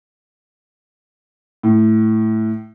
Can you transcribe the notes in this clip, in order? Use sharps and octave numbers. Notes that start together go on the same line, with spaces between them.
A2